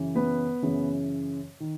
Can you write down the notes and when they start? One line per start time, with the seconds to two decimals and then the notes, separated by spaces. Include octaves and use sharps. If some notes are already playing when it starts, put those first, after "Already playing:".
Already playing: F#2 C#3 E3
0.15 B3 B4
0.62 F#2 C#3 E3
1.60 D#3